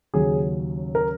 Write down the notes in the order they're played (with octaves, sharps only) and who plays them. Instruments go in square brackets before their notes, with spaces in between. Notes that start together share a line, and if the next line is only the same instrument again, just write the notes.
[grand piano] D#2 C#3 F#3 C#4 G#4
A#4